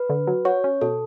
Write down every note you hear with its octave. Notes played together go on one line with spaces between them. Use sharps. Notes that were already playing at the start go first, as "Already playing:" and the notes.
Already playing: B4
D3
F#3
F#4 C#5
C#4
B2 A4